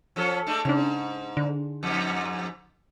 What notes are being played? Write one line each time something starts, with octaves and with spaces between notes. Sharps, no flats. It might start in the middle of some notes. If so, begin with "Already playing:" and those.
F3 C#4 A4
G#3 A3 D4
G#2 C#3 D4
D3
F2 G#2